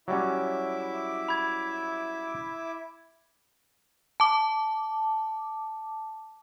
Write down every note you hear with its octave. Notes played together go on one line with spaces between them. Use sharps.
F#3 G3 C#4 E4 E5 D6
B5 G#6
A5 D6